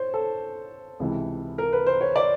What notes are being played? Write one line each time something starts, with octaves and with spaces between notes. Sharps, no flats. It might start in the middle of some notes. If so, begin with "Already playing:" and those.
Already playing: C5 C#5
A4
C#2 C3 E3
A#4
B4
C5
C#5
D5